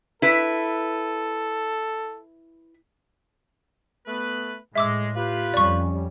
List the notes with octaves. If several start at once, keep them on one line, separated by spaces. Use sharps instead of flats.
E4 A4 B4
A3 B3 B4
A2 G#3 E5 D6 E6
F4 G4 B4
F2 G3 C#4 D5 C#6